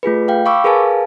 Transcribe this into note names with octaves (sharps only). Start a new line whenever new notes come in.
A3 F4 G#4 B4
F5 G5
F5 B5 C#6 D6 E6
G#4 A#4 B4 F5 G#5 A5